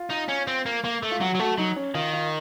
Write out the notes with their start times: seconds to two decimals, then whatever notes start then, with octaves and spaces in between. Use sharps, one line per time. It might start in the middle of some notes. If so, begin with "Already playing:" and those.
Already playing: F4
0.10 D#4
0.29 C#4
0.47 C4
0.66 A#3
0.84 A#3
1.03 A3
1.11 F4
1.21 F#3 F#4
1.35 F#3
1.40 A3 F#4
1.58 F#3 D#4
1.76 C#4
1.95 D#3 F4
2.13 F4